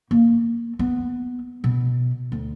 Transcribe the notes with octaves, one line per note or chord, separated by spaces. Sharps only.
A#3
B3
B2
D2